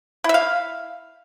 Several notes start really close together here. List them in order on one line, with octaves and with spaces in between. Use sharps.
E4 E5 F5